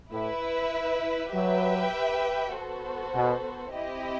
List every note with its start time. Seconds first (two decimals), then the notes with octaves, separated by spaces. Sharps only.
0.11 A2 E4 B4 E5
1.33 F#3 G4 B4 E5 G5
2.54 B3 F#4 A4 C5
3.14 B2
3.74 C4 E4 G4 D#5